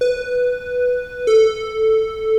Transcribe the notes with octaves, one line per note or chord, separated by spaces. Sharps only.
B4
A4